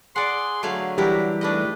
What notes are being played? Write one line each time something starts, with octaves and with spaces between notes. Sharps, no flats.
G#4 D5 F#5 C6
D3 F#3 A3 G#4 F5
E3 G3 D4 E4 G4 A#4
G#2 A3 D4 B4 D#5